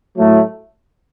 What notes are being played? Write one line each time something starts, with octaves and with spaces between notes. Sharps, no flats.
A2 F#3 A3